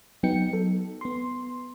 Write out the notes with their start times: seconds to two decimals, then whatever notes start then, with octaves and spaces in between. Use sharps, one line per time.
0.23 F#3 B3 D#4 G5 C#7
0.53 A4
1.01 B3 C6